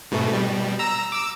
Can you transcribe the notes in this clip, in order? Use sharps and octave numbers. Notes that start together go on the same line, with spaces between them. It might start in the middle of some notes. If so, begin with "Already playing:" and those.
G#2 B2 A3
B2 G3
A#5 E6
D6 E6